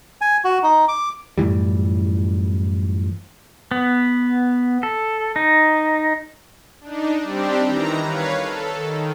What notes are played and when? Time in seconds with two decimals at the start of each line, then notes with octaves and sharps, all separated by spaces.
0.21 G#5
0.44 F#4
0.63 D#4
0.88 D6
1.38 F#2 A2 E3 G3
3.71 B3
4.83 A4
5.36 D#4
6.81 D4 D#4
7.24 G3 C4 D4 G4
7.63 D#3 E3 A#5
8.01 B4 C#5 F5
8.40 A4
8.76 D#3